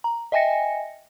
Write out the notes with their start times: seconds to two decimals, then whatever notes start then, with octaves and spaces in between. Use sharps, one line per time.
0.04 A#5
0.32 D#5 E5 G5 G#5 A#6 C#7